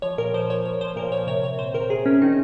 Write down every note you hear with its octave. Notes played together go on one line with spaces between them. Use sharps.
F3 C#5
A#2 A#4
F3 C5
F3 C#5
F3 C#5
F3 C5
A#2 A#4
A#2 C#5
C3 C#5
C3 C#5
C3 C5
D#3 A#4
C3 G#4
C3 C#4
D#3 D#4